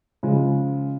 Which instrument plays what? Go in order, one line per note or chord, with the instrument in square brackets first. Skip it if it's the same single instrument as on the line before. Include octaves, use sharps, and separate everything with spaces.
[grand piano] C#3 F3 G#3